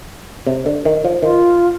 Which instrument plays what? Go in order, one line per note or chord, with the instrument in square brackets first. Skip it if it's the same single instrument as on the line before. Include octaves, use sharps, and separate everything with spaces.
[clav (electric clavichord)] C3
D3
D#3
F3
[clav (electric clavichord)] D#3 [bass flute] F4